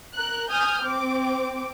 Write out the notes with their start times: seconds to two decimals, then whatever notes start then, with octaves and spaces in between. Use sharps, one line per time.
0.15 A#4 F#6
0.50 G#5 D#6 F6 G6
0.83 C4 D6